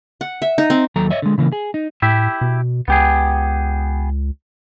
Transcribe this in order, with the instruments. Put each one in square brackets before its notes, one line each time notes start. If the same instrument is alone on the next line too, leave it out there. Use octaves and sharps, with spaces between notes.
[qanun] F#5
E5
D#4
C4
[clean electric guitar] D#2 F#3 A4 A#5
C#5 D#5 E5
D3 G#3
C#3 E3 A#3
G#4
D#4
[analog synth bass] A2 [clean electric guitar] E4 G4 E5
[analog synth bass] B2
[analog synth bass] C#2 [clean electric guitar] B3 G4 G#4